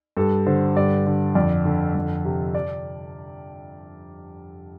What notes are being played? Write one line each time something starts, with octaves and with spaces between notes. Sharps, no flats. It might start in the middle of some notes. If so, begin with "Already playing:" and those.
G2 A4
D3 C5
G2 D5
D3
F2 D5
D3
F2
C3
D5